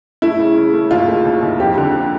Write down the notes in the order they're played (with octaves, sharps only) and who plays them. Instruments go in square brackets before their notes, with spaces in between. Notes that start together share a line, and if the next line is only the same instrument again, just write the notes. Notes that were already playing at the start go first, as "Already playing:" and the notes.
[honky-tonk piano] A3 [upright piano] E4
[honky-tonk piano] C#3
C#3
A3
[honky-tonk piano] D#2 [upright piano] F4
[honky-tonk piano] A3
D#2
D#2
[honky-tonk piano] F2 [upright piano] G4
[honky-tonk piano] D3